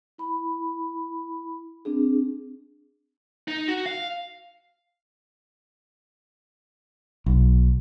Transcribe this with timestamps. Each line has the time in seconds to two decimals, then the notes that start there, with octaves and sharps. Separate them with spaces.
0.18 E4 B5
1.85 C4 D4 G#4
3.48 D#4
3.68 F#4
3.86 F5
7.26 B1